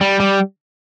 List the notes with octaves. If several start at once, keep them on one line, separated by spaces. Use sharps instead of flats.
G3
G3